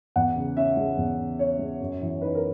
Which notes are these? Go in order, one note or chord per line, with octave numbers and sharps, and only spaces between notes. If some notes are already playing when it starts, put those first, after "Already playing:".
E2 F#5
C#3
C#4 E5
G#3
E2
C#3
C#4 C#5
G#3
F#2
E3
D#4 B4
A#4